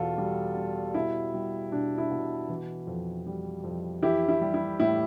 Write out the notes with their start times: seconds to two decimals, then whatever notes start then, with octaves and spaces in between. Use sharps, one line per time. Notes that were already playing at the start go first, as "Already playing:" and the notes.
Already playing: E2 B2 F4 A4
0.18 G3
0.57 G3
0.94 B2 E4
1.34 G3
1.72 B2 D4
1.98 E4
2.11 B2
2.49 E3
2.87 F2
3.26 G3
3.64 F2
4.03 E3 E4 G4
4.28 E4
4.41 G3
4.54 E4
4.80 A2 E4